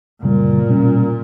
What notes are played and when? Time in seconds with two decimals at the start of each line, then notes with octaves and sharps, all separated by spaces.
0.22 F#2 A#2 C#3 G3
0.67 B2 G3 C#4